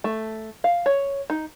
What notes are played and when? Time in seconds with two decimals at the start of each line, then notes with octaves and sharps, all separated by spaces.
0.04 A3
0.64 F5
0.86 C#5
1.30 D#4